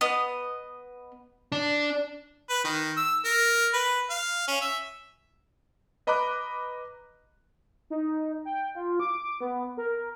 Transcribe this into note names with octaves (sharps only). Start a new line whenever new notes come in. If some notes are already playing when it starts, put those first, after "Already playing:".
B3 D#5
D4
B4
D#3
E6
A#4
B4
F5
C#4
E5
B4 D#5 A#5 B5 D6 F#6
D#4
G5
F4
D6
B3
A#4